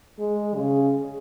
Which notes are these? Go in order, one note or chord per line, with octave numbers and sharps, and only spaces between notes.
G#3
C#3